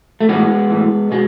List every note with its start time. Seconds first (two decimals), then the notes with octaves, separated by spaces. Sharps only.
0.21 A3
0.29 A2 E3 G#3 B3
0.70 A2 E3
1.11 B2 G#3